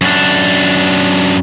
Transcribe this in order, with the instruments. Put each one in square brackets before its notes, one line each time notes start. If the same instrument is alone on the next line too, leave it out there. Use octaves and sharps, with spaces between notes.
[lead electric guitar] F#2 D4